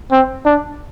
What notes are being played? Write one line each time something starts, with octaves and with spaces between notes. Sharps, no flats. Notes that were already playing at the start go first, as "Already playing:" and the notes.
C4
D4